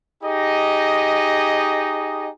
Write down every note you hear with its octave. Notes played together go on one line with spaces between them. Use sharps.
D#4 G4 G#4 D#5